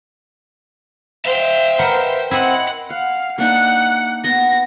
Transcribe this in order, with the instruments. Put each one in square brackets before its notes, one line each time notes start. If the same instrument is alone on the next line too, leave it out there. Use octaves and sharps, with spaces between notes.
[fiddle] C5 G5 [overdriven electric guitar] E5 F5
[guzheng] A#4 B4 F#5
[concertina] C4 [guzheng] E4 C5 D#5 [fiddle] F#5
[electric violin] F5 [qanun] F#5
[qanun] A#3 D4 D#4 [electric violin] F#5
[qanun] B3 [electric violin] A#6